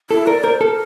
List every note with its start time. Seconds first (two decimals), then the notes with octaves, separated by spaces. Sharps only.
0.10 E4 A4
0.27 A#4 D5
0.44 A#4 C5
0.61 A4 A#4